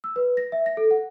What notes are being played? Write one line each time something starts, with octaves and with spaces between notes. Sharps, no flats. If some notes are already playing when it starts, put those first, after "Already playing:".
E6
B4
A#6
E5
A#6
A4
F#5